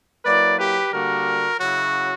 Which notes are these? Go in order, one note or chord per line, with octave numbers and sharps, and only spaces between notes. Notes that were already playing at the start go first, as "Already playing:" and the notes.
F#3 A#3 E4 B4 D5
G4 B4
D3 G3 A#3 F#4 A#4
C#3 F#3 C#4 E4 F#4